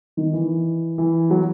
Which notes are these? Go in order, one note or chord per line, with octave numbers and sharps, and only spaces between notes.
D#3
E3
E3
F#3